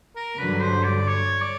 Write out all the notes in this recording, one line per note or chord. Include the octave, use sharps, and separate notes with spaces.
A#4
G2 D3 F#3 B4
C5
D5
C#5
D5